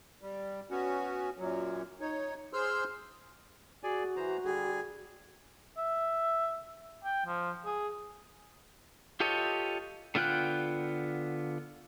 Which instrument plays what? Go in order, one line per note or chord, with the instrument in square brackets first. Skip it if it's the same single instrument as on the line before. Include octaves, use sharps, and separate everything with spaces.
[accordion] G3
B3 C#4 F#4
F#2 A#2 F#3
D#4 C#5
G#4 C5 C6 E6 F6 G6
[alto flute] F#4 [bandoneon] G#4 D5 G#5
[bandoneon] E3 C5 A#5
[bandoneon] D3 G3 [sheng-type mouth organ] G#4
[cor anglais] E5
G5
F3
G#4
[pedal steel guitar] F4 G4 A4 C#5 D#5
D3 B3 F4 G5 F#6